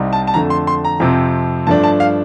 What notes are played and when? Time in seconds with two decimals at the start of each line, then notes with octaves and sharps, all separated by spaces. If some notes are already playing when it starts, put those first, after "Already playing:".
Already playing: C2 C3 G3 C4 D#4
0.13 A5
0.27 A5
0.34 F2 D3 A3 A#5
0.50 C6
0.67 C6
0.85 A#5
1.00 F2 C3 F3 C4
1.67 G2 F3 A3 D4 A5
1.84 A5
2.00 F5